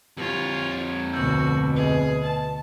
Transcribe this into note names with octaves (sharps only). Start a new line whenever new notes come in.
F2 F4 G4 C#5
D2 B2 F#4 E6 G6
G#4 B4 D#5
A5